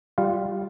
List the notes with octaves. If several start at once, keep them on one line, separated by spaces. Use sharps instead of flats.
G3 F4 F5